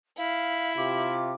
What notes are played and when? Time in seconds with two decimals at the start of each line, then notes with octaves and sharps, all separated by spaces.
0.17 E4 F5
0.77 C3 F4 G4 D6